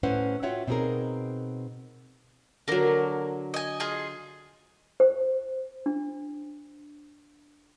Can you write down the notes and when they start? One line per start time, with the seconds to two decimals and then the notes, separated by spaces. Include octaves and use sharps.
0.03 A2 C#4 E4 B4 C5 F#5
0.43 F4 F#4 C#5 E5 F#5 G5
0.67 B2 C4 D#4 F#4 G#4 A#4
2.68 D3 F#3 A#3 A#4
3.54 D#5 G#5
3.80 F4 G#4 D#5
5.00 C5
5.86 D4